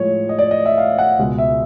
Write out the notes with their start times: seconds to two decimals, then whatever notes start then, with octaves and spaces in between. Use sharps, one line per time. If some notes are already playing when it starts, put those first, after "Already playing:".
Already playing: A2 F3 G#3 C#5
0.29 D#5
0.39 D5
0.51 D#5
0.66 E5
0.78 F5
0.98 F#5
1.19 C#2 B2 G#3
1.38 E5